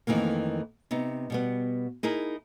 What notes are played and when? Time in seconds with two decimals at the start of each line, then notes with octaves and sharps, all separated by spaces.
0.07 F2 D#3 E3 A3 A#3
0.91 C3 B3 D#4
1.30 B2 G3 B3
2.03 D#4 E4 G#4 A#4